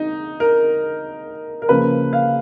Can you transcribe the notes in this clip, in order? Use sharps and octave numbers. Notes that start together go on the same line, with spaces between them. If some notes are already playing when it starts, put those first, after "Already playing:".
Already playing: D#4
A#4
A#4
C#3 F3 A#3 B4
F5